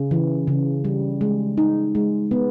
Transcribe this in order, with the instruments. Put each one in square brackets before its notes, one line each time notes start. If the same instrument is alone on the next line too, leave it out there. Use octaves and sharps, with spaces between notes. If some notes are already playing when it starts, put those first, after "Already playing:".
Already playing: [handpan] C#3
E3
C#3
G3
G#3
D#4
G#3
B3